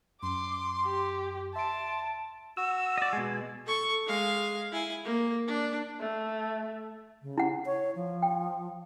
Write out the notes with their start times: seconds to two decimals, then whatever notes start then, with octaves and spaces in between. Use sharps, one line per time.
0.22 F#2 C6 D6
0.85 G4
1.55 E5 A5 C6 D7
2.57 F#4 E6
2.98 D5 D#5
3.13 B2 G#3 G#5
3.66 A4 C#6
4.06 G#3 F5
4.72 E4 G#5
5.04 A#3
5.47 D4
6.00 A3
7.22 C#3
7.38 E4 F#5
7.66 C#5
7.95 F3
8.22 G5